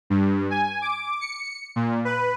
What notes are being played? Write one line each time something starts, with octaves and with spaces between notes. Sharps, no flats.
G2
G#5
D6
C#7
A#2
B4